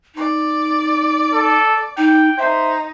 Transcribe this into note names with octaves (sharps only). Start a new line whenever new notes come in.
D#4 D5
A4
D#4 G5
D#4 C5 E5